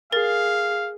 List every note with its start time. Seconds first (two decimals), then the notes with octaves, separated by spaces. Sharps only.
0.12 G#4 A#4 F5 A6